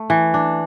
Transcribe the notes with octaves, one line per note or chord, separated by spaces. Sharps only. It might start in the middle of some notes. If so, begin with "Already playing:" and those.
Already playing: A3
E3
D4